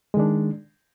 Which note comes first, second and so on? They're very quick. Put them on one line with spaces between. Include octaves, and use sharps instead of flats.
G#3 D#3 D4